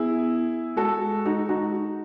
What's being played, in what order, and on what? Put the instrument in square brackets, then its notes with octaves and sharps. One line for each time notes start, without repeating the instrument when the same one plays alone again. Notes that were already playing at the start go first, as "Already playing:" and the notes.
Already playing: [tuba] B3 [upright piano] E4 G#4
[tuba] G#3 [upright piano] F#4 A4
[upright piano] D#4 F#4
D#4 F#4